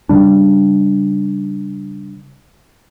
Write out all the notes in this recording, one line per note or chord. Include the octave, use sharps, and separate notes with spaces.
C#3 G3 D4